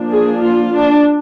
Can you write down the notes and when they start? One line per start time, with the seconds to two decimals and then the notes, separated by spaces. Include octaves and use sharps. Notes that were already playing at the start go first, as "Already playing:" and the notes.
Already playing: F3 A#3 D4
0.11 G#4
0.41 F4
0.72 D4